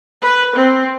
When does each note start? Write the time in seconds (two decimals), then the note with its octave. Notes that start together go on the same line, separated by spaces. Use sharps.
0.21 B4
0.55 C4